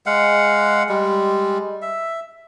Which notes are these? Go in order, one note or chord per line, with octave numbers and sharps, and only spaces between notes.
G#3 F5 F#5
G3 G#3
E5